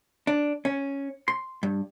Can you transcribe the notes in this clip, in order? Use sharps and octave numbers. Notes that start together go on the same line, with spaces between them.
D4
C#4
C6
G2